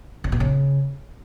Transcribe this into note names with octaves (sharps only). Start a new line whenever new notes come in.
C#3
B2
C#3